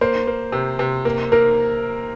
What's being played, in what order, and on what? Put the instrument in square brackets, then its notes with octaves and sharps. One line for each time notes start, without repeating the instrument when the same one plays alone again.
[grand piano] A#3 [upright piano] C5
[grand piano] A#3
C3
C3
A#3
[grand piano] A#3 [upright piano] A#4